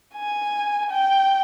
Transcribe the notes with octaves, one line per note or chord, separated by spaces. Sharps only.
G#5
G5